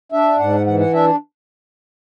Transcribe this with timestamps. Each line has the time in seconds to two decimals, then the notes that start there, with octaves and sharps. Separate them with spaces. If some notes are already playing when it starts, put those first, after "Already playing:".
0.12 D4 E5
0.39 G#2 F#5
0.67 E3 F#5
0.80 F#5
0.93 D4 E5